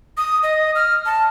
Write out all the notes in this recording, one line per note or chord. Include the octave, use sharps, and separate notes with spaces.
D#6
D#5
F6
A5